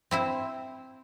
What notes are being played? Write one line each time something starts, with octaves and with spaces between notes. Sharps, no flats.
C4 E4 C5